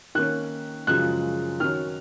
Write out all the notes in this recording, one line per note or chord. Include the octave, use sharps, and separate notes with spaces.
D#3 A#3 C#4 F#6
F#2 C#3 F3 G#3 F#6
D#3 F#3 C#4 F6